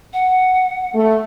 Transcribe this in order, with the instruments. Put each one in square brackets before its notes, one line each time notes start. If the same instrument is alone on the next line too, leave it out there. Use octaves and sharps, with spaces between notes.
[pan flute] F#5
[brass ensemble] A3